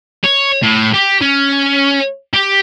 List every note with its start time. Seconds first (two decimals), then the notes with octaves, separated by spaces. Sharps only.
0.24 C#5
0.63 A2
0.94 G4
1.21 C#4
2.34 G4